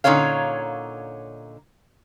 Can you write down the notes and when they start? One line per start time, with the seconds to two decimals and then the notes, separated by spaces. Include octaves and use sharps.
0.04 A#2 D3 C#4 D#4 C#5 F5